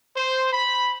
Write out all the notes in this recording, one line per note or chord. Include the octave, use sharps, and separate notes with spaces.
C5
B5